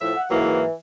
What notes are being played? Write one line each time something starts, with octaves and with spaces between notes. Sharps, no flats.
A2 F3 E5
F#5
G#2 E3 F#3 A#3